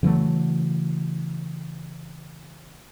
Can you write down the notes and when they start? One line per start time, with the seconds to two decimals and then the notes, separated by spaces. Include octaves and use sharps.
0.03 C#3 E3 F#3 A3